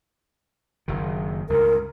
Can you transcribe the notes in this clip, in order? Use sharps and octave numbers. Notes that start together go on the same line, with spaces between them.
F#1 D#3
C#2 G2 A#4